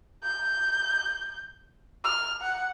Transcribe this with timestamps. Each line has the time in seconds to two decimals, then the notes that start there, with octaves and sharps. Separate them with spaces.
0.23 G6
2.04 F6
2.42 F#5